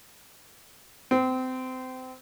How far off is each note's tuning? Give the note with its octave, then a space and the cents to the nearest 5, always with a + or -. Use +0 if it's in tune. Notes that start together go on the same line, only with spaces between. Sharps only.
C4 -25